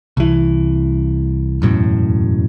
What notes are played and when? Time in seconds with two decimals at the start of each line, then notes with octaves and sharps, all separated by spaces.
0.17 C2 E3
1.62 E1 F#2 A2